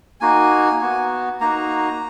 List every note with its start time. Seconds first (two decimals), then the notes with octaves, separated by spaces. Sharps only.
0.20 A#3 D#4 F#4 G#5
0.81 B3 F#4
1.41 A#3 D#4 F#4 A#5